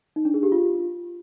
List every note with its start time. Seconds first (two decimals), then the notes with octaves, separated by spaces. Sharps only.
0.16 D#4
0.25 D4
0.34 G#4
0.43 G4
0.52 F4